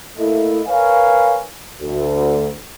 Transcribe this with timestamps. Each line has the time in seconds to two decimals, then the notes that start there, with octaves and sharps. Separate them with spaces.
0.18 A3 A#3 E4 D#5
0.67 A#4 B4 C#5 F5 G#5
1.81 D2